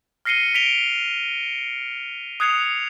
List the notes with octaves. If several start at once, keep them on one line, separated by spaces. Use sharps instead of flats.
F6 A#6 C7 C#7 D#7 G7
B6 D7 F7 G7
D#6 F#6 G#6 C7 C#7 F7